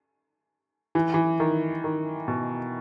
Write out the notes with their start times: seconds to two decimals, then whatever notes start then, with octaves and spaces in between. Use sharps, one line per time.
0.95 E3
1.14 E3
1.40 D#3
1.84 D#3
2.28 B2